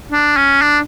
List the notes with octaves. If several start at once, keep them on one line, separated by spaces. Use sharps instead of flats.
D4
C#4
D4